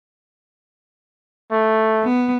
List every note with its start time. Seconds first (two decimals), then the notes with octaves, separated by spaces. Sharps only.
1.52 A3
2.03 B3